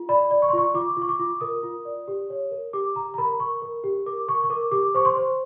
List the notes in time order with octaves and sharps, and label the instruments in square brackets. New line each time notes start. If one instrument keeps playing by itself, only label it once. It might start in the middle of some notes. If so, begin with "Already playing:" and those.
Already playing: [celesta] F4
D5 B5
D5
C#6
C6
F4 C#6
F4 D6
F4 C#6
D6
F4
A#4 D#6
F4
D5
G4
C#5
A#4
G4 D6
G4 A#5
A#5
A#4 B5
A#4 C#6
A#4
G4
A#4 D6
A#4 C#6
C#6
A#4 D6
G4 D6
C5 C#6
C6
C5